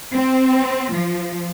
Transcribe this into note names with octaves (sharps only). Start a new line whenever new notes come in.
C4
F3